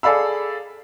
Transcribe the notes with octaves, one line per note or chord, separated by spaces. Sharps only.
G#4 A4 D5 F5 B5 E6